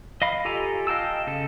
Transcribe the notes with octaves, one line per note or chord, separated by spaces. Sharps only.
D#5 F5 B5
F4 G4 A4 G#5 A#5
D#5 F5 G5 A5 E6
C#3 A4